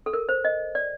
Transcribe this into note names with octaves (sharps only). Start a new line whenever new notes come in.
A4
A#4
C5
D#5
D5